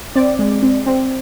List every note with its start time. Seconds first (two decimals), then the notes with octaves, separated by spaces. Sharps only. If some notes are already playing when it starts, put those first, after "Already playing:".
0.15 C4 D5
0.39 G#3
0.63 C4
0.86 C4